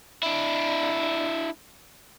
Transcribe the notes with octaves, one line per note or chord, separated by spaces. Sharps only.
D4 E4